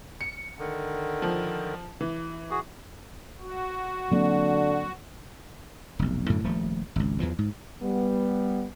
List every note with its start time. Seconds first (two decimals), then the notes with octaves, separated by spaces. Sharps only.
0.21 C#7
0.59 D3 D#3
1.22 F3
2.01 E3
2.51 F#4 G#4
3.40 F#4
4.12 D3 F#3 A#3 C4
5.99 F1 B1
6.29 F#2 A2 D3
6.44 D#1 F3 A3
6.96 G#1 C#2
7.20 E2 E3 F3
7.39 G#2
7.81 G3 B3